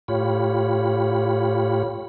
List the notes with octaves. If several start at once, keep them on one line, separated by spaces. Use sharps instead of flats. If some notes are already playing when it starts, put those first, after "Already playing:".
A2 F4 G4 C#5 B5